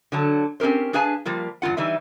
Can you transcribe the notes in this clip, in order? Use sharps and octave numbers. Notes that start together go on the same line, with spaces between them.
D3 F#3 A5
C4 C#4 G4 A#4 C5
D4 G#4 B4 F5 G#5 A5
F3 G3 A#3 F4
E2 G2 E3 F4 F#5
E3 G3 D#4 E4